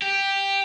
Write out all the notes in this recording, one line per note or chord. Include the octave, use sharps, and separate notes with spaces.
G4